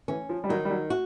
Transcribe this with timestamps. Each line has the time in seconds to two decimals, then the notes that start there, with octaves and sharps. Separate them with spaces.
0.08 E3 C#4
0.29 F3
0.44 G3
0.49 D#3 F#3
0.65 G3
0.70 F#3
0.90 F#4